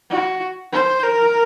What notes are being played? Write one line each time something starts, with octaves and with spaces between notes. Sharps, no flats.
F#4
C5
A#4